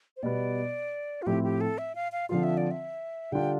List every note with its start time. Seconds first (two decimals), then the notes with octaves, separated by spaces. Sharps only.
0.17 C5
0.23 B2 G3 B3 D5
1.22 F4
1.27 A2 F3 C4 E4 G4
1.44 G4
1.61 A4
1.78 E5
1.95 F5
2.12 F5
2.29 D3 F3 C4 F4 F5
2.43 E5
2.57 D5
2.71 E5
3.32 D3 G3 D4 F4 G5